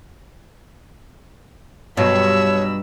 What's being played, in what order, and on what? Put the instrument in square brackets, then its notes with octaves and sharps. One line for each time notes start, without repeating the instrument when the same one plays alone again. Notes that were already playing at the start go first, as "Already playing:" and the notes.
[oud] G2 F4 [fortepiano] B2 F#3 [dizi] C#5 [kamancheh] B5 E6